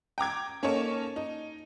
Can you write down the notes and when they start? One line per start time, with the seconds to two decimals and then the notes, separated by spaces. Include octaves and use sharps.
0.18 G5 A#5 D6 G#6
0.63 A#3 C#4 D#4 A4 C#5 A5
1.16 D#4